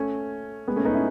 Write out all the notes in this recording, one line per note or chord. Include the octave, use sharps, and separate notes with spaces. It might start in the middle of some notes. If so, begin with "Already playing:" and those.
Already playing: A3 C#4
G#3 B3
A3 C#4
B3 D#4
C#4 E4